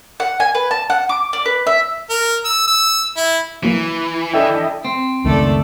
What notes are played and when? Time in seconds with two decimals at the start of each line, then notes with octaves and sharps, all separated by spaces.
0.20 F#5
0.40 G#5
0.55 B4
0.71 A5
0.90 F#5
1.09 D6
1.33 D5
1.46 B4
1.67 E5
2.10 A#4
2.45 E6
2.68 E6
3.17 E4
3.63 E3 F#3 A#3
4.34 D4 E4 A4 D#5 E5 G5
4.85 C4
5.24 C#2 F#2 D#3 A3 A4 D5